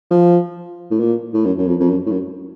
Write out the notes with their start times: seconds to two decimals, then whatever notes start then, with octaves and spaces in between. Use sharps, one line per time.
0.11 F3
0.91 A2
1.00 A#2
1.34 A2
1.45 F#2
1.58 F#2
1.67 F2
1.80 F2
1.89 F#2
2.07 A2
2.11 F#2